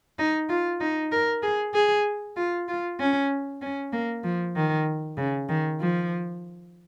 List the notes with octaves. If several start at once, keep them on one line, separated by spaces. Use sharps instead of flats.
D#4
F4
D#4
A#4
G#4
G#4
F4
F4
C#4
C#4
A#3
F3
D#3
C#3
D#3
F3